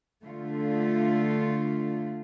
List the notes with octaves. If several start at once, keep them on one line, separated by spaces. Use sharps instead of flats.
D3 A3 F4